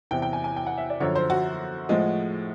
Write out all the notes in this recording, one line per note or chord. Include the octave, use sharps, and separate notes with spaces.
E2 C3 E3 G5
G5
G#5
G#5
G5
F#5
E5
D5
F#2 D3 F3 C#5
C5
F#4
A2 F3 G#3